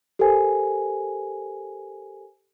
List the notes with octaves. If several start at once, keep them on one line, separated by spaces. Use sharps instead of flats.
G4 A4 A#4 C5 G#5